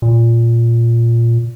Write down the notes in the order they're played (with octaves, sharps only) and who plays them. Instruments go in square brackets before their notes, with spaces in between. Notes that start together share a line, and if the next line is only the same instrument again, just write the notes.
[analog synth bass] A#2